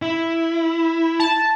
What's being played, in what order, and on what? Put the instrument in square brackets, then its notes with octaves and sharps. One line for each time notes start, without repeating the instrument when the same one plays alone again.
[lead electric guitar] E4
[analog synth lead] A5